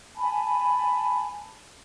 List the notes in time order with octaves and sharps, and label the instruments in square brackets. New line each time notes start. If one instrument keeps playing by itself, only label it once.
[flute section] G#5 A5 B5